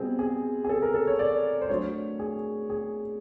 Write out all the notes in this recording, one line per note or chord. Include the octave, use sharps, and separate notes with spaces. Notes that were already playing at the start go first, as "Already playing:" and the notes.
Already playing: B2 G3 C4 G#4
G#4
G#4
A4
A#4
A4
C#5
D5
C5
F#3 A3 D4 C#5
G#4
G#4